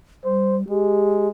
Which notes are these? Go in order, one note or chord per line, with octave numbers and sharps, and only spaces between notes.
G3 C5
G#3 G4